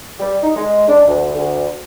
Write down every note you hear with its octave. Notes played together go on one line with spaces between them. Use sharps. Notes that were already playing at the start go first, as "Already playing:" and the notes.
G3
D#4
G#3
D4
D2
D2